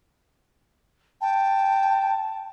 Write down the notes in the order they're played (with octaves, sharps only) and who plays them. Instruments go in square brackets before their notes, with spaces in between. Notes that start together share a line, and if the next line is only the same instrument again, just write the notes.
[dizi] G5 [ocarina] A5